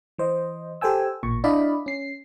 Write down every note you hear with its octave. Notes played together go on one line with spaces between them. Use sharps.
E3 C5 D#5
G4 A4 C5 G5 G#5 E6
A1 A#2 C#6
D4 E4 D5 D#5 F5 B5
C#4 C7